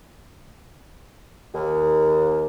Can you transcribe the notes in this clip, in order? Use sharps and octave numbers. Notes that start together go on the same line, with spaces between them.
D#2